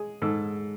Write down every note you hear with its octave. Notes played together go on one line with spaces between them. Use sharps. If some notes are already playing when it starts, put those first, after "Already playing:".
Already playing: G#3 G#4
G#2 A4